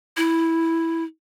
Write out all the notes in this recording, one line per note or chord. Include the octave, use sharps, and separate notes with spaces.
E4